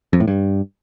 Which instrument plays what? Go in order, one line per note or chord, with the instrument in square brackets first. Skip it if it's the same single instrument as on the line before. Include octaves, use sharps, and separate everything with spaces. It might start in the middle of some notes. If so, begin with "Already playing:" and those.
[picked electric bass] F2
A2
G2